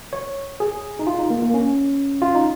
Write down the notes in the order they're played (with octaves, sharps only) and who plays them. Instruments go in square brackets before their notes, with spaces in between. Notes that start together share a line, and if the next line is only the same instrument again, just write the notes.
[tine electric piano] C#5
G#4
D#4
F4
D#4
A#3
A#3
C#4
F4
D#4